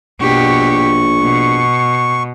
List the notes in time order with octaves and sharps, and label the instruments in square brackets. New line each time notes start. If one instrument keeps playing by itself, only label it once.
[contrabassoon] A#1 [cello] B2 G4 [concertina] C#6
[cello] B2